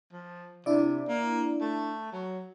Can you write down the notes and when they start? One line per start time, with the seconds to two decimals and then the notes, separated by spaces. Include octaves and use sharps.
0.12 F3
0.66 C3 D4 E4 D5
1.08 A#3
1.61 A3
2.12 F#3